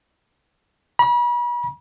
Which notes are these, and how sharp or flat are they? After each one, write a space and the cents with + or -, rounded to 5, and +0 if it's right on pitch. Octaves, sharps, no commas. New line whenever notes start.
B5 -40